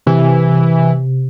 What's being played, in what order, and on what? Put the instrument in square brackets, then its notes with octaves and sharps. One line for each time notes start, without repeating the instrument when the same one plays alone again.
[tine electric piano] C3 [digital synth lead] E3